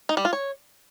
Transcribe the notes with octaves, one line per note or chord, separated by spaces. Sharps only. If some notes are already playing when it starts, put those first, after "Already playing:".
D#4
G3
F4
C#5